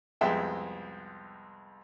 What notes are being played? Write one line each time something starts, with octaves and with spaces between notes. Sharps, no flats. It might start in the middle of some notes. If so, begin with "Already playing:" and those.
C2 F2 G#3 B3 E5 G5